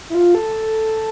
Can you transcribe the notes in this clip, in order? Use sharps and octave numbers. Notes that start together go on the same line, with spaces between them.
E4
F4
A4